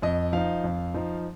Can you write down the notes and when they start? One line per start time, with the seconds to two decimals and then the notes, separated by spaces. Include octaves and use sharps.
0.02 F2 D#5
0.33 F3 D#4 F5
0.64 F2
0.94 F3 D#4